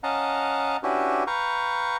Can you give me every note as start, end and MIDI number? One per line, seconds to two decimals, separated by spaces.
0.03 0.77 61
0.03 0.77 75
0.03 0.77 77
0.03 0.77 78
0.03 0.77 81
0.03 0.77 82
0.83 1.24 61
0.83 1.24 62
0.83 1.24 64
0.83 1.24 66
0.83 1.24 67
0.83 1.24 71
1.27 1.97 71
1.27 1.97 77
1.27 1.97 79
1.27 1.97 82
1.27 1.97 85